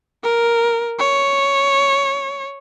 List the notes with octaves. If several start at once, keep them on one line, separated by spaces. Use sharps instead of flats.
A#4
C#5